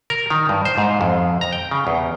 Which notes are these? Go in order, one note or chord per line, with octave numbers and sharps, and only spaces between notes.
A#4
D#3
G2
C5
G#2
F2
A#5
G5
C#3
E2